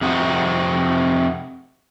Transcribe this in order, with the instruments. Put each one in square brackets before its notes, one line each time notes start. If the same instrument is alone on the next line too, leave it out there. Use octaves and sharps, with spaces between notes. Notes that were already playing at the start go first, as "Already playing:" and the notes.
[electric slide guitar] F2 C3 D#4 F#4